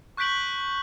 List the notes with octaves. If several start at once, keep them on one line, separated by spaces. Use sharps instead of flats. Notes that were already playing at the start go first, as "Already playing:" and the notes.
C#6 F#6 G6 B6 D7 F#7